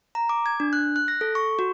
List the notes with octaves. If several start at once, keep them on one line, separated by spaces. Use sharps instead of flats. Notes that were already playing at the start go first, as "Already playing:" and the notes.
A#5
D6
G#6
D4
F#6
F#6
A#6
A4
C#6
F#4